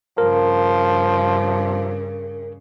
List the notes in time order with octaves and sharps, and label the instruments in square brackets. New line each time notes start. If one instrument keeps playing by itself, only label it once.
[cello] G2 C#3 [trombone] F3 [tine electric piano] A#4